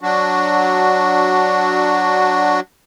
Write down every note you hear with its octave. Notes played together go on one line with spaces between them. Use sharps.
F#3 D4 F#4